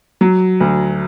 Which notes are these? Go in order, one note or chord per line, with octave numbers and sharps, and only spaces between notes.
F#3
D2